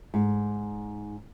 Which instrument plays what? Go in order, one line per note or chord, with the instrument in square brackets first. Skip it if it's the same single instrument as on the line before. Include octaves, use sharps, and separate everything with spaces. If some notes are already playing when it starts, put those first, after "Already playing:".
[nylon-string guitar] G#2